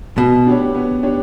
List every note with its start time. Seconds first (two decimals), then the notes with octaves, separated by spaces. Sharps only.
0.18 B2 B3
0.47 D4 G4 C#5
0.75 B3
1.03 D4 G4 C#5